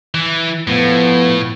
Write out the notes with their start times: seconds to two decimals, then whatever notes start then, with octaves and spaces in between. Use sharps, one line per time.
0.14 E3
0.67 A2 F3 B3